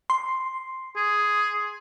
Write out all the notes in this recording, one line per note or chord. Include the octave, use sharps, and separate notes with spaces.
C6
G#4